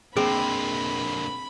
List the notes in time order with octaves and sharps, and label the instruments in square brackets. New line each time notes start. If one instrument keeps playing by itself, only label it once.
[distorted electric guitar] D3 A#3 [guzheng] C4 [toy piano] G#4 [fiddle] B5